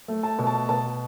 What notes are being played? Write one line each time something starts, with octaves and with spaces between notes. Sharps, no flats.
A3
A5
B2
A5
B2 A5